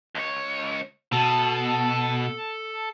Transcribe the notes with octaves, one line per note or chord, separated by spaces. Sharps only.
C#2 C#5
B2 A4 A5